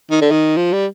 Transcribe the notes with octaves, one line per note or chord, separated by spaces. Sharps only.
D#3
D3
D#3
F3
G3